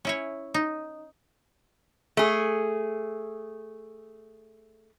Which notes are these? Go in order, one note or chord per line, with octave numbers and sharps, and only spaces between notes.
C#4 E4 C#5
D#4
A3 G#4